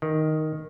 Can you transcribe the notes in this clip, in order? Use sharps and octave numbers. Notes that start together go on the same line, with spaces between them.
D#3